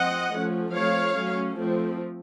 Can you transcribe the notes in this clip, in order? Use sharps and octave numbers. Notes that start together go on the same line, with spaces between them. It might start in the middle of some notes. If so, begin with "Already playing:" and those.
Already playing: F3 C4 D#5 F#5
F3 A3 C#4
F3 A3 C4 C#5 F5
F#3 A3 C#4
F3 A3 C4